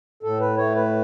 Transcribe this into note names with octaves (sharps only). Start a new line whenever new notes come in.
A2 A4
B4
A3 C#5
B4